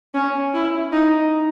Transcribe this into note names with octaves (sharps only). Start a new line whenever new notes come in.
C#4
E4
D#4